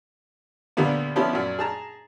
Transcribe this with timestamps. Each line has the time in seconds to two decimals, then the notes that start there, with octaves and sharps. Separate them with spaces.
0.77 D2 A#2 G3 A#3 B3
1.16 F3 G3 B3 C#4 E4
1.33 F#2 A#2
1.58 G#4 A5 A#5